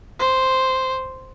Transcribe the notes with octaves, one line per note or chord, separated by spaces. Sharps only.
C5